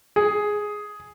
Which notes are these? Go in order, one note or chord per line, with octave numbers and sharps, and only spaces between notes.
G#4